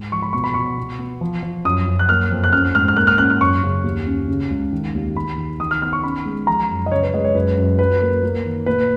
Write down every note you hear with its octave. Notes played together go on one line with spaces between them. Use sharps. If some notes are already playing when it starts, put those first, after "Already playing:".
Already playing: G#2
F3 C#6
B5
B2 C#6
B5
B2 C#6
B2
B3
F3
F3
F#2 D#6
F#2
F#6
A#3 F6
F2
F#6
C#4 F6
G#2 F6
F6
A#3 F#6
F6
C#4 F#6
F6
F#2 C#6
C#3
D#2
C#4
C#3
C#2
D#3
D#2
D#2 B5
D#3
D#3 D#6
F6
B3 F6
C#6
C#4 B5
G#3
F3 A#5
F#2
D#5
C#3 C#5
B4
G#3 D#5
C#5
F#2 B4
F#2
F#3 B4
A#3
A#3
D#3
A#2 B4